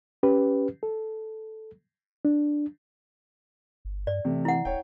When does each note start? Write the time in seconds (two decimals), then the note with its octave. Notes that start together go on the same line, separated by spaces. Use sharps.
0.23 C#4 G4 B4
0.83 A4
2.25 D4
3.85 G1
4.07 G2 D5
4.25 C3 E3 A3
4.45 E4 F#5
4.65 D#1 C#5 G5